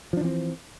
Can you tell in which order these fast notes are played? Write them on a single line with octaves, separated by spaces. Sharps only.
F3 D4 E3 C4